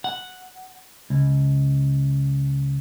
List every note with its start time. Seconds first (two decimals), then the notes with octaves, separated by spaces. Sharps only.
0.04 F#5
1.10 C#2